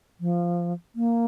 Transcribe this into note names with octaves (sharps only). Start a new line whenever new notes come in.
F3
A#3